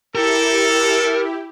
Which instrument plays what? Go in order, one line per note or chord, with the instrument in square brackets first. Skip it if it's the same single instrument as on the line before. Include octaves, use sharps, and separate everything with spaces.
[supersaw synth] E4 G4 [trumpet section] A4 [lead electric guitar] A#4